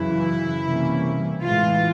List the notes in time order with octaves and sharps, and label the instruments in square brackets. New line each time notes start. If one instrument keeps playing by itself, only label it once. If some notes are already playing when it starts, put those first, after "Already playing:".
Already playing: [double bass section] F#2 C#3 E3 [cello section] E4
[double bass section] C3 E3 G3 A#3 C#4
[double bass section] A2 E3 G#3 [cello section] F4